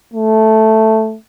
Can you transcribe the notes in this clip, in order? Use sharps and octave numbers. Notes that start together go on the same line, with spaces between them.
A3